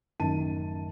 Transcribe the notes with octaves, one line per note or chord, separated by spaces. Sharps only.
A1 F#2 D#3 A5 D#7